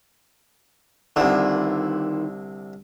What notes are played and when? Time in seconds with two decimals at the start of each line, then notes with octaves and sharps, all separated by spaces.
1.16 C2 D3 D#3 E4 F4